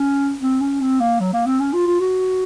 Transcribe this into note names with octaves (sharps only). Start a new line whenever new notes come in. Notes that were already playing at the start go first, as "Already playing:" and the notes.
Already playing: C#4
C4
C#4
C4
A#3
F#3
A#3
C4
C#4
F4
F4
F#4